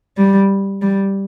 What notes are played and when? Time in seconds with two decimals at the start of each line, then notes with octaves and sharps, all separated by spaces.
0.17 G3
0.82 G3